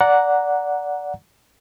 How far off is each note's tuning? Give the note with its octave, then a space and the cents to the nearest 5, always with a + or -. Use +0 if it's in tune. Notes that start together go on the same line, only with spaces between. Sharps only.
D5 -15 F#5 -10 A#5 +0